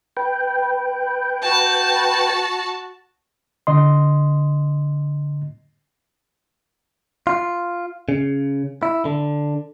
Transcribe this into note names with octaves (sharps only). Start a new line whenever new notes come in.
B4 G5
F#4 A5
D3 D#5 C6
F4
C#3
E4
D3